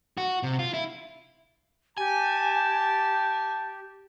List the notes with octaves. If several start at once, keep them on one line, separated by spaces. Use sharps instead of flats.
F#4
C3
F4
E4
G4 G#5 A5